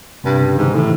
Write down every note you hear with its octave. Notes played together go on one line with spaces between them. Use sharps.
G2 C3
C#3
G#2 D#3
E3
A2 D#3